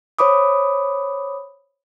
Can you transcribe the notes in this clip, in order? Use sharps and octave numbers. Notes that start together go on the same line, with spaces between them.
C5 C#5 B5 D6 D#6